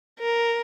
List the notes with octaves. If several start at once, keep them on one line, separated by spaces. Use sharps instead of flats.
A#4